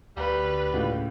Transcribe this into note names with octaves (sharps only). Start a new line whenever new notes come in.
D2 G3 B4
C#2 A2